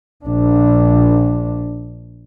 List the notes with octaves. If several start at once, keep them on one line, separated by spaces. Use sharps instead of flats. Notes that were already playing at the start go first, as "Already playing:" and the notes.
A#1 D4